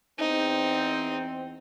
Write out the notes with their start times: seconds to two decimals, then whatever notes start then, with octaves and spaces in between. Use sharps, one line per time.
0.19 E2 C4 D#4